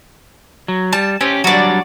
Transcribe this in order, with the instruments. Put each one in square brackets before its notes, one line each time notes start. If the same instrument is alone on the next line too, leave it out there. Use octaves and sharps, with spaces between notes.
[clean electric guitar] F#3
[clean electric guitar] G3 [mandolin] A5
[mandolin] C4 [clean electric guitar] C#4 G4
[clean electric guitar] F#3 G3 D4 [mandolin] F#4 D5